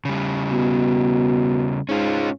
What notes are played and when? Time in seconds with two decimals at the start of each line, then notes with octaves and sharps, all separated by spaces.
0.05 C#3 G3
0.51 B2
1.89 G#2 C#4 F4